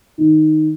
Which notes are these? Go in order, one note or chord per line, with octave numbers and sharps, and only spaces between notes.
D#3